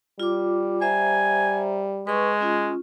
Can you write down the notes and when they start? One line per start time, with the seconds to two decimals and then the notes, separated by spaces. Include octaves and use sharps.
0.20 G3 F4 D6
0.81 C5 E5 G#5 A#5
2.07 G#3 B4 C#6
2.41 C#4 F4